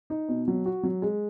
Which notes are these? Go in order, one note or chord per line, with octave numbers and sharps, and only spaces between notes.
D#4
B2
F#3
F#4
F#3
G#3